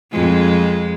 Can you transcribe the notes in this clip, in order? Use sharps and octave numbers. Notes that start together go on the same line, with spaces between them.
F2 G#3